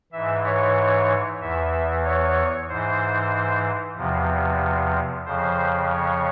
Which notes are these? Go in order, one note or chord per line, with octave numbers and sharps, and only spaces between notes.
G#2 E3 E5
C#5
E2 E3 E5
C#5
G#2 E3 C5
E2 C3 F3
F2 C#3 F3 C5
C#5